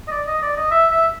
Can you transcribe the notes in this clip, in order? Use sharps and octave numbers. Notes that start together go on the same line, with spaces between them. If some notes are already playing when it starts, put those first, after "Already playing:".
D#5
D5
D#5
D5
D#5
E5
E5